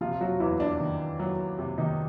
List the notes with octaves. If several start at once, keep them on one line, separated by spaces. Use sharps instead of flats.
C3 F3 F4
F4
F#3 F#4
E2 E3 E4
D4
D#3
F#3
C3
D#3 D#4